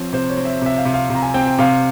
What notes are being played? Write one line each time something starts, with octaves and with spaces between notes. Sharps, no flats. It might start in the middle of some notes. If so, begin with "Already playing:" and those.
Already playing: F3 C4 C#5
C3 C5
C#5
C4
E5
C3 E5
F5
C3
F5
C3
A#5
G#5
C4 G5
G5
C3 F5